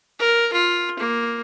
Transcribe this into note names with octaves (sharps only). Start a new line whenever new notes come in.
A#4
F4
A#3